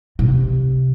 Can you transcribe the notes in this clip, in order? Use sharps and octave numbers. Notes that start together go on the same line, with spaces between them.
C3